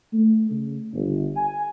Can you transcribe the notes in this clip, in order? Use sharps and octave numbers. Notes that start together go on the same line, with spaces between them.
A3
C#3
G1
G#5